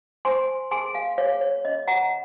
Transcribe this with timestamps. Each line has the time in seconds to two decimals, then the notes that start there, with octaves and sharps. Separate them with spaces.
0.25 C5 G#5 C6
0.71 G#4 G#5 C6
0.94 F5 G#5
1.18 G#4 C#5 F5
1.41 C#5
1.65 C#4 D#5
1.88 F#5 A#5